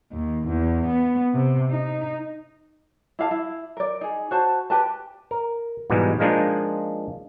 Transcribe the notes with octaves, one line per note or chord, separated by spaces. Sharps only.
D#2
E2
B3
C3
D#4
E4 G4 F5 A5
E4
A#4 D5
D#4 G#4
F#4 C5 A5
G4 B4 A5
A#4
G#2 B2 E3 G3 G#3
F3 G#3 A#3 D4 D#4 F4